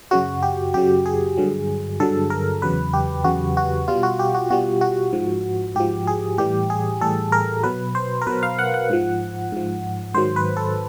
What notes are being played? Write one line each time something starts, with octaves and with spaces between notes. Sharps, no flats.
F#2 C#3 F#3 F#4
G4
F#2 C#3 F#3 G4
G#4
G2 D3 F#3
G2 D3 F#3 A4
A#4
E2 C#3 F#3 B4
G4
E2 C#3 F#3 F#4
F#4
B2 G3 F4
F#4
G4
F#4
B2 G3 F#4
F#4
G#2 F3
G#2 F3 G4
G#4
A2 E3 G3 G4
G#4
A2 E3 G3 A4
A#4
B2 F#3 B4
C5
A#4
B2 F#3 B4
F5
F#5
F#5
G#2 F3
G#2 F3
G#2 D#3 F#3 C5
B4
A4